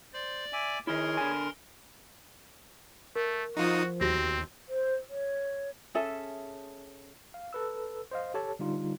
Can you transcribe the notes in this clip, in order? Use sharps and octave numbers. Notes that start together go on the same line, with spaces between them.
C5 D5
E5 G#5 D6
D#3 E4 G#4 A#4 C#5 C6
D3 G#5
A3 A#4
F3 D#4 F4 F#4 D#6
D#2 C4 F#4 G4 A#6
C5
C#5
C#4 G#4 A4 E5
F5
A4 B4 E6
C5 D#5 F5
G4 A4 C#5 A5
D3 G3 D#4 F4